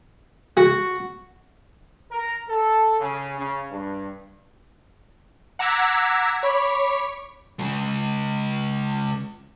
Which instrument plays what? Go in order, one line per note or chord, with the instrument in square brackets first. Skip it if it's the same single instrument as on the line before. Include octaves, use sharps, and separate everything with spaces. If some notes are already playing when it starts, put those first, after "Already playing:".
[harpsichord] F#4
[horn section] A#4
A4
C#3
C#3
G2
[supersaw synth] F#5 A#5 D6 E6 G#6 B6
C#5 B5 D6
[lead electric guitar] C#3 G#3